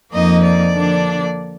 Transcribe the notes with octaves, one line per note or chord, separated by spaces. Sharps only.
F2 F3 A#3 D#4 D#5
D5
D3 F3 A#3 D4